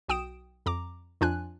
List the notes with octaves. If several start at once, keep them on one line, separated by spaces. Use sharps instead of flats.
B1 F#4 G5 D#6 D7 E7
F2 A#5 D6
F2 F3 D4 F4 G#5 F#6